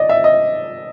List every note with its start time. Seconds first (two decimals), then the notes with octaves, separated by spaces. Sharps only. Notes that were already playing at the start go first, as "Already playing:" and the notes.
Already playing: D5 D#5
0.09 E5
0.24 D#5